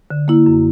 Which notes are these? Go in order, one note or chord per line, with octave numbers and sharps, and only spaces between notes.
D3
A#3 E4
F#2